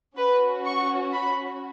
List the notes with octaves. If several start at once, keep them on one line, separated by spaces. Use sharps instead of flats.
C#4 F#4 B4
C#6
B5